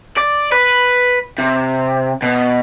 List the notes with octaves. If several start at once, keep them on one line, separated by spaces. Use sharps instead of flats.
D5
B4
C3
B2